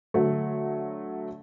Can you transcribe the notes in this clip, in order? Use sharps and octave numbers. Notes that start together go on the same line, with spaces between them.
D3 F#3 A3